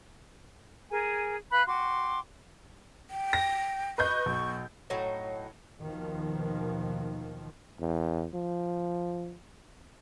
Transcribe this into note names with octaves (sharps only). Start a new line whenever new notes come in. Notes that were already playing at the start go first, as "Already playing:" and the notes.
G#4 A#4 G#5
B4 F5 B5 F#6
F#4 G5 C6 D6
G5
A#6
B4 D#5 C#6 G6
B1
A2 F#3 D#4
D#2 B2 D#3 F3
E2
F3